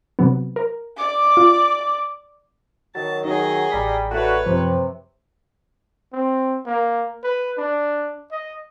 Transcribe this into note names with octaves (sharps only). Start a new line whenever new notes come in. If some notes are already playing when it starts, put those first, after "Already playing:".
C3 F#3 B3
A#4
D5 D6
F4
D#3 F#3 A5 A6
D#3 F#3 D#4 G#4 D#5
A1 G3 A#5 B6
A3 D4 F#4 B4 C#5
F#2 C3 F3 C5
C4
A#3
B4
D4
D#5